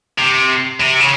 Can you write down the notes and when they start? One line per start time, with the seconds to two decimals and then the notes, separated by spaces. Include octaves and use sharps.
0.18 C3
0.80 C3
1.00 C#3